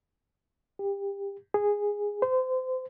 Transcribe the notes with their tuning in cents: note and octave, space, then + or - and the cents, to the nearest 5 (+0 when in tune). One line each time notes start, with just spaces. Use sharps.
G4 +25
G#4 -10
C5 -30